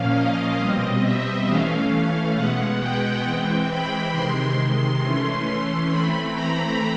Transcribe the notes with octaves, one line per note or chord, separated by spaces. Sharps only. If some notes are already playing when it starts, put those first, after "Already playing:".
Already playing: A#2 F3 A#3 C#4 F5
D#5
B2 G3 C4 D#5
E5
E3 A3 C#4 F5
F5
B2 G#3 B3 F#5
G5
E3 G#3 C4 G5
B5
C3 D#3 G#3 C6
C6
E3 A3 C#4 C6
C6
E3 A3 C4 B5
A#5